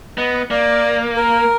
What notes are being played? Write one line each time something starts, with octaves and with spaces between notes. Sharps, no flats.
B3 D#5
A#3 D5
A#4